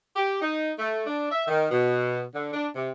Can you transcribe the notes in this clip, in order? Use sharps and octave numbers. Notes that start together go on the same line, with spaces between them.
G4
D#4
A3
D4
E5
D#3
B2
D3
D4
C3